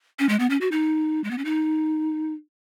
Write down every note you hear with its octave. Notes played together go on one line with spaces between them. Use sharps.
C#4
G#3
B3
C#4
F#4
D#4
G#3
B3
C#4
D#4